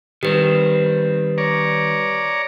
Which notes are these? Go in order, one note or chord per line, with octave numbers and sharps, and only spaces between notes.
D#3 G3 C4 G4 B4
C#5 D5 A#5